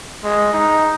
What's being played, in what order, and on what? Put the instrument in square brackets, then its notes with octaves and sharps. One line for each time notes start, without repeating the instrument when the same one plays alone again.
[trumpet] G#3
D#4